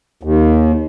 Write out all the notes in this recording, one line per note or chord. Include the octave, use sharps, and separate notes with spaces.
D#2